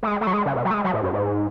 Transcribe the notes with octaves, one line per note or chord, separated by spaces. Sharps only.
A3
G#3
A3
F#3
G#3
C#3
B2
F#3
A3
G#3
F#3
A2
F#2
G#2